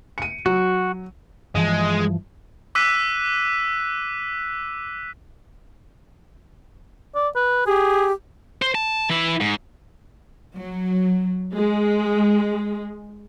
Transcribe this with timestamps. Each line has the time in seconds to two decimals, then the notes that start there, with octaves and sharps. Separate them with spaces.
0.18 C#7 D#7
0.46 F#3 F#4
1.55 G2 E3 F3 G#3
2.75 D6 E6 F#6 B6 D#7
7.15 D5
7.36 B4
7.66 G4 G#4
8.62 C5
8.75 A5
9.10 E3 E4
9.41 G#2
10.57 F#3
11.55 G#3